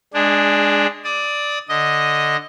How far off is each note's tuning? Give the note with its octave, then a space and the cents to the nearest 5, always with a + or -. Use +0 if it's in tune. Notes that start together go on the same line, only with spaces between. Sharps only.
G#3 +0 D4 +0 G#4 -30
D5 +0 D#6 +35
D3 +0 D#5 +0 D#6 +5